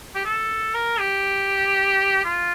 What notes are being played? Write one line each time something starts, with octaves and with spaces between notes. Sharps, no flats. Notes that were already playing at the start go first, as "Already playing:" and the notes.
G4
A4
A#4
G4
F4